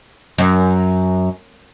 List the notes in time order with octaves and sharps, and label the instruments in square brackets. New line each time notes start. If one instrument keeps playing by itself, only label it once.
[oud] F#2